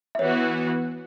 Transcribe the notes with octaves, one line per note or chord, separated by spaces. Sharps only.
E5
E3 B3 F#4 C#5